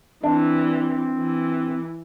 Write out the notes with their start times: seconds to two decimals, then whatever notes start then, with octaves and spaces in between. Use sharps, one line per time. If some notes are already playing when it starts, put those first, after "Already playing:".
0.24 E3 C4 D4
1.18 E3